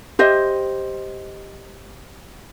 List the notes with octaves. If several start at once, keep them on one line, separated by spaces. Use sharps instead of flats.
G4 C5 D#5 E5